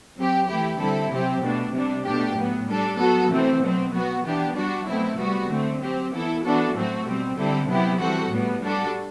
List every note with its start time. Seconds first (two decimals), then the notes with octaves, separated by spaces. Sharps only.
0.17 F#3 C4 G4
0.48 E3 A3 E4 G4
0.79 D3 G3 C4 E4 A4
1.12 C3 F#3 C4 G4
1.43 B2 A3 D4
1.73 C3 G3 D4
2.05 B2 A3 D4 G4
2.36 A2 F#3 B3
2.68 G3 D4 A4
2.98 F#3 B3 F#4 A4
3.30 C3 E3 A3 C4
3.61 B2 F#3 C4
3.93 F#3 B3 F#4
4.24 E3 B3 D4 G4
4.55 G3 D4 F#4
4.87 B2 F#3 A3 C4 E4
5.17 C3 G3 B3 F#4
5.48 D3 A3 C4
5.80 F#3 C4 G4
6.12 E3 B3 E4 A4
6.43 E3 B3 D4 F#4 A4
6.74 A2 F#3 A3 C4 F#4
7.05 B2 G3 C4
7.36 D3 G3 C4 E4 A4
7.67 C3 F#3 B3 E4 G4
7.99 E3 G3 C4 F#4 A4
8.30 A2 G3 B3
8.62 G3 D4 F#4 A4